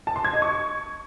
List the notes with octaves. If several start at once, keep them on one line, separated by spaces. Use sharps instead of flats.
A5
C6
G#6
D#5
C#6